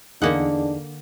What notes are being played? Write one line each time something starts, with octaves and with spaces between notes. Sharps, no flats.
E2 D3 A#3 D4 D#4 G#4 F#5